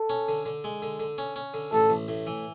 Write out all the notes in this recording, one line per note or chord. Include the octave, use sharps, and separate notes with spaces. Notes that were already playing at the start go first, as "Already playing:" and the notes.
Already playing: A4
C#4
D3
D3
G#3
D3
D3
C#4
C#4
D3
A1 A4
A1
A2
E3